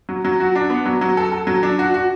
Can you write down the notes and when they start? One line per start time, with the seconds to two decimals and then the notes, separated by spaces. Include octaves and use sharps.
0.09 F#3
0.25 F#3
0.40 F#4
0.55 D4
0.70 B3
0.86 F#3
1.01 F#3
1.17 A4
1.32 A4
1.47 F#3
1.63 D4
1.79 F#4
1.94 F#4